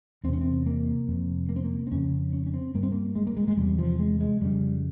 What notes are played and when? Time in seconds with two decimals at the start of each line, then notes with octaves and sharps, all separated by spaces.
0.24 E2 C4
0.29 C3 C#4
0.41 C4
0.66 A#3
1.08 F2 C3
1.49 A#3
1.56 C4
1.64 A#3
1.87 C4
1.91 F2 C#3 C#4
2.33 C#4
2.47 C#4
2.54 C4
2.75 G2 A#3
2.83 C4
2.92 A#3
3.15 G#3
3.27 A#3
3.37 G#3
3.48 G#3
3.57 E2 C3 G3
3.79 F3
3.99 G#3
4.20 G#3
4.41 F2 C#3 G3